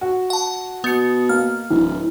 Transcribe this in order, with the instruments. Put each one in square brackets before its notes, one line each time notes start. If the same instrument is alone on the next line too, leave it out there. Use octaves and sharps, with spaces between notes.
[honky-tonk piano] F#4
[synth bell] F#5 A5
[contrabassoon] B2 [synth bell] B3 C#7
[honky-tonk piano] A#3 [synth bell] F6
[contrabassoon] D1 [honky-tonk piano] E3